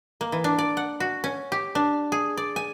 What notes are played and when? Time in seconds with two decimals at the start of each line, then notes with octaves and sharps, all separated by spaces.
0.21 A#3
0.32 E3
0.44 D4
0.59 D5
0.77 F#5
1.00 F#4
1.24 C#4
1.52 G4
1.75 D4
2.12 G#4
2.37 D5
2.56 G#5